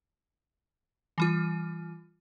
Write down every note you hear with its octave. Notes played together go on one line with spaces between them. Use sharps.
E3 G3 F4